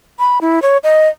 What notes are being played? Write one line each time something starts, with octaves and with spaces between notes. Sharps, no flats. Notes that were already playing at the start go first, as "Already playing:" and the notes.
B5
E4
C#5
D#5